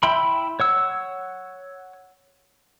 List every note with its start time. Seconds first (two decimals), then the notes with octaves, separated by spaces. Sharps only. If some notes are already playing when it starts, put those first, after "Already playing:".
0.03 E4 E5 G5 B5 C6
0.60 C#5 F#5 E6